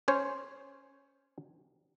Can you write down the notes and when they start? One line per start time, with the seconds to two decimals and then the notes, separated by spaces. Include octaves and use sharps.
0.08 C#4 C5 C#5